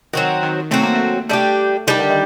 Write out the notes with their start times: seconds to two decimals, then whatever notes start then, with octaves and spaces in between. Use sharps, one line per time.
0.13 D#3 F#3 C4 F#4
0.43 D#3
0.71 F#3 A3 C4 F#4
0.83 A#3
0.95 A3
1.29 G3 A3 D4 G4
1.87 D#3 G3 D4 G4
1.99 D3
2.10 D#3